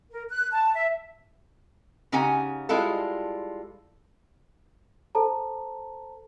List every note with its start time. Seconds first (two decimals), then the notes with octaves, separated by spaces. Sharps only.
0.11 A#4
0.29 F#6
0.51 A5
0.74 E5
2.12 C#3 C#4 D#4 G4 F#5 G#5
2.69 G3 G#3 E4 F4 A4
5.15 A4 C5 A5 A#5